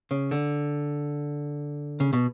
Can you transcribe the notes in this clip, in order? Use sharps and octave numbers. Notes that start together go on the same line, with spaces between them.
C#3
D3
C#3
B2